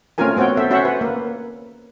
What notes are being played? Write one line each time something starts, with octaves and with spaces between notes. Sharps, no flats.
A3 C4 C#4 F4 A#4 G#5
B3 C4 F#4 C#5 G5
A4 C5 E5
C#4 F#4 C5 E5 F#5
B4
A#3